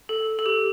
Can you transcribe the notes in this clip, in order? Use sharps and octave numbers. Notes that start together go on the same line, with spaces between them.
A4
A4
G4